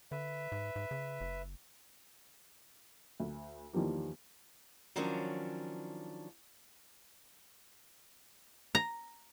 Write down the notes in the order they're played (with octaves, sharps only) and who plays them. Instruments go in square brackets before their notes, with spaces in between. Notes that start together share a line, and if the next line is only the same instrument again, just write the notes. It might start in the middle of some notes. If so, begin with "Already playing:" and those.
[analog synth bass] D3 [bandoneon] B4 E5
[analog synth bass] G#2
G#2
C#3
F#1
[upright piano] D2
E2 D#3 F3 G3 A#3
[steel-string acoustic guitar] D#3 F3 F#3 C#4 D4
[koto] A#5